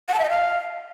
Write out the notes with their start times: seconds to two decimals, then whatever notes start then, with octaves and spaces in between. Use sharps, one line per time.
0.08 F#5
0.14 A5
0.19 E5
0.24 D#5
0.29 F5